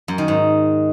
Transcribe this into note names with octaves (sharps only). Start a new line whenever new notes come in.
F#2
D#3
G#2